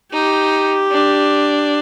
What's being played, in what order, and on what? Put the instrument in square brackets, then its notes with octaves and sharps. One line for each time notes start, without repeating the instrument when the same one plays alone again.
[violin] D#4 [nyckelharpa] G4
[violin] D4